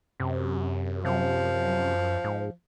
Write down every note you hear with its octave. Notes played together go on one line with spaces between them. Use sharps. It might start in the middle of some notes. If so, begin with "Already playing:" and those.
F#2 C3
C3 F3
G#2